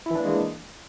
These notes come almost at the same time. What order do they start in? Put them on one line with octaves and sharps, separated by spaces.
E4 E3 D4 A#3 G#3